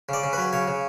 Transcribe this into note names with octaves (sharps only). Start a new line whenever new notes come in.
C#3 D5
C#3
F#3 B4
C#3 C#5
C#3